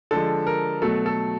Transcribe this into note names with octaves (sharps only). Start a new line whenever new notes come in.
D3 F3 G#3 A4
A#4
B2 F#3 A3 A4
A4